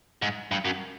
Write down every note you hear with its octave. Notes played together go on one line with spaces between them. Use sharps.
G#2
G2
F#2